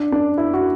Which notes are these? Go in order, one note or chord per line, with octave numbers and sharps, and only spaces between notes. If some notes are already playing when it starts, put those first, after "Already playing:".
Already playing: D4
D4
E4
F#4